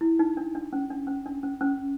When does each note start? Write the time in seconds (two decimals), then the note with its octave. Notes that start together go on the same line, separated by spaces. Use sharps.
0.01 E4
0.19 D#4
0.37 D4
0.55 D4
0.73 C#4
0.90 D4
1.07 C#4
1.26 D4
1.43 C#4
1.61 C#4